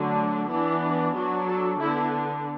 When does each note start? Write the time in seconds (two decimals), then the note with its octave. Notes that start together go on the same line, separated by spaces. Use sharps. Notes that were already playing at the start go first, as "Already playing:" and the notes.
Already playing: D3 F#3 A3 D4
0.49 E3 B3 D4 E4
1.15 F#3 D4 F#4
1.49 A4
1.81 D3 B3 D4 E4